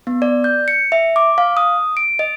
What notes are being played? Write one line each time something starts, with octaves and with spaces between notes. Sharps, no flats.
B3
D5
G6
C#7
E5
D6
F5
D#6
D7
D#5